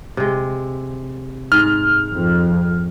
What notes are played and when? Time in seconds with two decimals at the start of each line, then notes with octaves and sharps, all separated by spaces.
0.17 C3 G#3
1.52 G#2 F6
2.10 F2